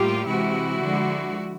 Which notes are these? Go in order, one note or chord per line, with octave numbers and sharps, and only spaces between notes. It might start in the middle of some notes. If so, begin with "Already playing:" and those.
Already playing: A2 G3 A#3 F4 G4
C3 E3 G#3 E4 F#4
D3 F3 G#3